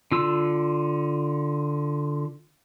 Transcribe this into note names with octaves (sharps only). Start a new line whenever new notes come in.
D3 F4 E6